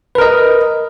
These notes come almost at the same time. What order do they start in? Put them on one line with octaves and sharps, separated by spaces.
B4 A#4 D#5